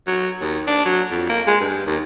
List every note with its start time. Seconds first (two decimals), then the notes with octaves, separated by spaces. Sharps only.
0.07 F#3
0.41 D#2
0.67 D4
0.86 F#3
1.11 F2
1.29 A#3
1.47 G#3
1.60 G2
1.86 D#2